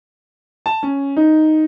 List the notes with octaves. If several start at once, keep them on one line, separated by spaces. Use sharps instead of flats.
A5
C#4
D#4